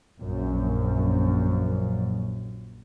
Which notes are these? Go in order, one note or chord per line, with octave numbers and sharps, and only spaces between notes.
A#1 F#2